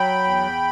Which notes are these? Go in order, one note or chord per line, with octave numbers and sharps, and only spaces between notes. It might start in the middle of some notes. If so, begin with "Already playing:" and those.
Already playing: F#3 G5 B5
E2